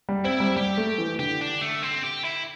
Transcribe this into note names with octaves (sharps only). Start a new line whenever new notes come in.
G3
C4 E4
G3
G3 G4
A3
E3
D3 G4
D4
A3
C4
G4
E4